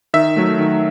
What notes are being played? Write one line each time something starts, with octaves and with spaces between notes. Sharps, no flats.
D#3 E5
F#3 A3
D#3